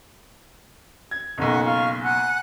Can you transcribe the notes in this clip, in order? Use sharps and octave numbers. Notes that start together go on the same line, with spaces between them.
G#6
F#1 B1 F#5 C#6
F4 F5 C#6
F#5 G#5 F#6